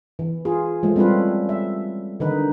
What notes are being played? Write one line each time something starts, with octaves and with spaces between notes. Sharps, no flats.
E3
F4 G#4
F3 G#3 A3
G3 C4 C#4 E4 F4 B4
E5
D3 D#3 D#4 B4